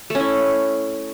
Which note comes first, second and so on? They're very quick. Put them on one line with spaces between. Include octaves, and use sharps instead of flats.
A3 C#4 E4